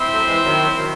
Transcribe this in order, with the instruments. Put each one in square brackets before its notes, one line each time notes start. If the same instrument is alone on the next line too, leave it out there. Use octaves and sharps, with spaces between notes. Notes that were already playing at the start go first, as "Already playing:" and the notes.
Already playing: [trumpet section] C4 E4 C5 E5
[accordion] F#3 A3
E3 G#3
D#3 F#3
D#3 F#3